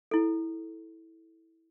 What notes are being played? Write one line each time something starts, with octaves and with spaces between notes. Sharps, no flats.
E4 A4